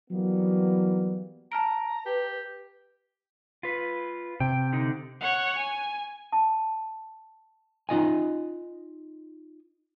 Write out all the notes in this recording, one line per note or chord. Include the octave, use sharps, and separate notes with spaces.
E3 F#3 G3 A#3 B3
A5 A#5 F6 D7
G4 B4
F4 B4
C3 G5
D3 D#4
C#5 F#5
G#5
A5
D#4 F4 D#5 G#5